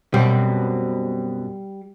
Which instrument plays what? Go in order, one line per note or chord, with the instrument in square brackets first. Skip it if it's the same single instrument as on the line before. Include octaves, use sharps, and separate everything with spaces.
[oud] F#2 B2 C4 [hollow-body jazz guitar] G3